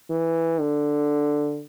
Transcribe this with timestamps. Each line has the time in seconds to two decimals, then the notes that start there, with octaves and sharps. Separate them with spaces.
0.10 E3
0.60 D3